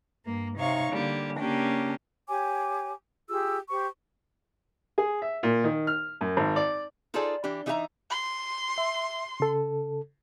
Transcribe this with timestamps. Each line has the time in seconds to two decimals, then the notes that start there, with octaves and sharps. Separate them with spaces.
0.25 G2 A#3
0.57 C3 D#4 C#5 F5 C#6
0.92 D3 G3 A#3
1.37 C#3 A#3 C#4 D4 G4
2.28 G4 C#5 G#5 D6
3.29 F4 G4 G#4 E6
3.70 G4 C5 C#6
4.98 G#4
5.22 E5
5.43 A#2
5.64 D#3
5.87 F6
6.21 F#2
6.37 G#1
6.56 D5
7.14 D#4 F4 G#4 A4 C5 D5
7.44 E3 D4 G4
7.66 E3 D#4 G4 A4 E5 A#5
8.10 C6
8.78 E5
9.40 C#3 A4